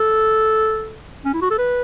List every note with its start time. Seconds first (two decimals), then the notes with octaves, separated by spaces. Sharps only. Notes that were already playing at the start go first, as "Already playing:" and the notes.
Already playing: A4
1.25 C#4
1.34 E4
1.42 F#4
1.51 A4
1.58 B4